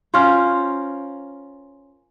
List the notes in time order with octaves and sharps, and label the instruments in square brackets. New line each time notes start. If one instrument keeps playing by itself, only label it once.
[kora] C#4 F4 A#4 C5